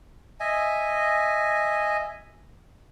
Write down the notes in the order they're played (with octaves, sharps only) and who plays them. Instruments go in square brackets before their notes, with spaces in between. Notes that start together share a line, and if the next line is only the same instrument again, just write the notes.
[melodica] D#5 E5 G#5